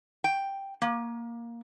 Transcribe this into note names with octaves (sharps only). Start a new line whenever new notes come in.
G5
A#3